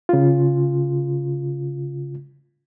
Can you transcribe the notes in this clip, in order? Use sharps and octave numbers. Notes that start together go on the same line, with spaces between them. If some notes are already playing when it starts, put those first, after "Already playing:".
C#3 F4